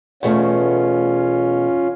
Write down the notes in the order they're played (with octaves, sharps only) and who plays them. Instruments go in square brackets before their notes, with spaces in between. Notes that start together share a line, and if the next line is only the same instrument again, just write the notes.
[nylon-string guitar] E2 B2 A3 [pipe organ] C#4 F4